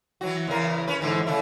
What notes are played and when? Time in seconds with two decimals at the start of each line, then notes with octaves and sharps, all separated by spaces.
0.21 E3 F#3 F#4
0.47 E2 C#3 A#4
0.87 C#4 B4
1.01 G#2 D3 E3
1.26 C#3 A3 E4